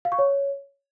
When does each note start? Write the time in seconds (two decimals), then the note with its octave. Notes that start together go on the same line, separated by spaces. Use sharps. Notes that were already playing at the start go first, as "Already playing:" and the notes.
0.05 F5
0.12 C#6
0.19 C#5